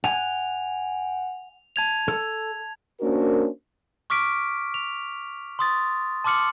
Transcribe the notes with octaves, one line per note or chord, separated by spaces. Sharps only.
F#5 G#5 F7
A5 G#6 F7
A4
A#3 C#4 D4 F#4 A#4 C5
C#6 D6 F6 B6 D7
F7
C6 D#6 A6
A5 C6 D6 F6 C#7 F#7